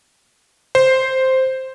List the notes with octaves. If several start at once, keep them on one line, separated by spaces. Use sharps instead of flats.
C5